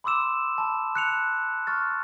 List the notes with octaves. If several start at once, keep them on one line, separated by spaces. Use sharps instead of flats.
B5 C6 D6 E6 E7
A5 B5
F#6 C#7 F7
C#6 F6 A6